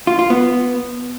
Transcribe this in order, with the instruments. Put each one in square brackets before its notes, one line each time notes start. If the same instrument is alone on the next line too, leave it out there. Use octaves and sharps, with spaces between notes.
[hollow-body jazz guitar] F4
F4
B3